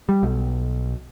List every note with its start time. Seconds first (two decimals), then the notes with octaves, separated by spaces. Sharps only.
0.09 G3
0.23 B1